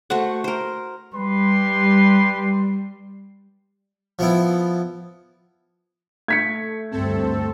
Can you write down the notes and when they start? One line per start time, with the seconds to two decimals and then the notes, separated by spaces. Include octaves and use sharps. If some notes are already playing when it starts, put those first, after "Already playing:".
0.10 A3 F#4 C5 F#5
0.44 A#4 C5
1.14 G3 G4 B4 C6
4.19 F3 B3 E4
6.28 A3 G#6 B6 C#7
6.91 D2 G2 C4 A4